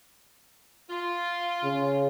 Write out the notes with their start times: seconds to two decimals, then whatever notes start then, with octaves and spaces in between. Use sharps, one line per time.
0.90 F4
1.64 C#3